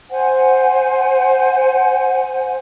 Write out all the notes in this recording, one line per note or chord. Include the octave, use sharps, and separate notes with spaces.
C5 F#5 G#5